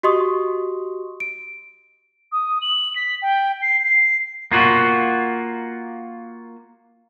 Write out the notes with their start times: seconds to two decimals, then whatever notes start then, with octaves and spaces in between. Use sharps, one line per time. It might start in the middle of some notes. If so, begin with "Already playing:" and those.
0.03 F#4 G4 D#5 C6 C#6 D#6
1.20 D7
2.32 D#6
2.61 F#7
2.95 B6
3.22 G5
3.62 C7
3.83 C7
4.52 A#3 F4 F#4